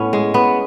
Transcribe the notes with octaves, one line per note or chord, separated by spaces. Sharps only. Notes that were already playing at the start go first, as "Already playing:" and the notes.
Already playing: A2 B3 C#4
G#3
B3